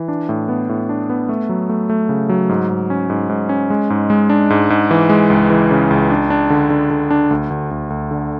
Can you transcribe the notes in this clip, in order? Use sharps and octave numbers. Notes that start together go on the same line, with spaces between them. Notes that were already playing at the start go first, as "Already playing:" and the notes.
Already playing: E3
D4
A2
B3
A2
D4
B3
A3
F#3
A3
A3
C#3
F#3
G#2
G#2
C#4
G#2
G#2
C#4
G#3
G#2
G#3
D4
G#2
G#2
E3
G#3
C#2
E3
C#3
C#2
D4
D4
D3
D3
D3
D4
D2
D2
D2
D2
D3